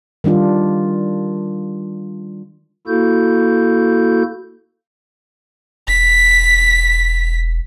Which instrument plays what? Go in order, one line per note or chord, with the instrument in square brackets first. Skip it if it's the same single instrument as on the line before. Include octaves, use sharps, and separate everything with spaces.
[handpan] D#3 G3 D4 F4
[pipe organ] A#3 E4 F#4 A4 G6
[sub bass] E1 [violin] B6